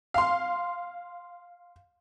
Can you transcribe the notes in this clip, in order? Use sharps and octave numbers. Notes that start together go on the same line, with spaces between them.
F5 C6